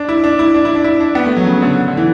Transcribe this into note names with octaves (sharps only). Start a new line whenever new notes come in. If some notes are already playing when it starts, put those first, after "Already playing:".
Already playing: D4
E4
D4
E4
D4
E4
D4
E4
D4
B3
A3
F#3
C#3
D3
D3
E3